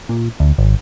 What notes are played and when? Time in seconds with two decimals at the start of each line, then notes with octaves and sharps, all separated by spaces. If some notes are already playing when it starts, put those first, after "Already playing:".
0.09 A#2
0.40 D2
0.58 G#1